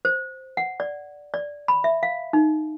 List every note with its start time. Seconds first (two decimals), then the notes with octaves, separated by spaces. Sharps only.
0.05 C5
0.57 F#5
0.80 D5
1.34 D5
1.68 B5
1.84 E5
2.03 F5
2.33 D#4